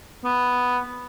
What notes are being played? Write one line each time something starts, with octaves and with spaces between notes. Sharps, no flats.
B3